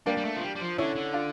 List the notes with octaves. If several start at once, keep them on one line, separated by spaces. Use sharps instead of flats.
G3 A#3 D4
G3
A3
F3
G3
G3
F3
D3 C#4 E4
D3
D4 F4